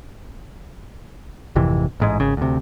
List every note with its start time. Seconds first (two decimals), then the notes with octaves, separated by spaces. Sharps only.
1.56 G#1 F2 C3 E3
2.00 A1 G#2 G#3
2.20 G#1 C#3
2.37 D2 C3